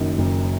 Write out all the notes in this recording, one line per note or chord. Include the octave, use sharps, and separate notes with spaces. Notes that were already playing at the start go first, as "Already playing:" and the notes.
Already playing: F#1 F#2 D#3 F#3
F#1